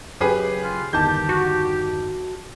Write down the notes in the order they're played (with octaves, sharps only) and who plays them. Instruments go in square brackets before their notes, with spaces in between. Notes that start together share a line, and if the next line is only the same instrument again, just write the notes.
[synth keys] F#2 C#3 [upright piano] G4 G#4 B4
[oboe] F4
[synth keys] G1 E2 D#3 [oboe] G4 [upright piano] A5 G6
[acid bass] F#4